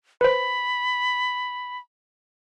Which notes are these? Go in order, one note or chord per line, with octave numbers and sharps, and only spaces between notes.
B4 C5 B5